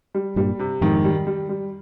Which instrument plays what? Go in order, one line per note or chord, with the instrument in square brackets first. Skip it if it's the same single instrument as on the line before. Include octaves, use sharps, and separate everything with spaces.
[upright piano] G3
[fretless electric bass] G2 A#2 [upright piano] G3
[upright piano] C3
[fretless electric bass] F2 G#2 [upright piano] D#3
[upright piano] G3
G3
G3